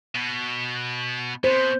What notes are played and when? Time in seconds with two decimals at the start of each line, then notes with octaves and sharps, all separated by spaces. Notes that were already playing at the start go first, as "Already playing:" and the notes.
0.15 B2
1.44 B2 C5